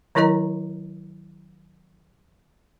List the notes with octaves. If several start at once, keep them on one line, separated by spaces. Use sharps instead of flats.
D#3 F#3 E4 A#4 D#5 A#5